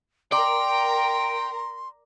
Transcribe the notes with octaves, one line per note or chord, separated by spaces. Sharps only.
A#4 D5 G5 A#5 C6